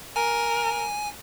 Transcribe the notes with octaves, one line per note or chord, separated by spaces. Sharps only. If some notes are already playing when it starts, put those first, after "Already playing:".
A#4 G#5